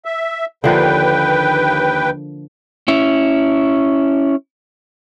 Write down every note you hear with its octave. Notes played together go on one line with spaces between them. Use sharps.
E5
D#2 D3 F3 A#3 B4 G5
C#4 E4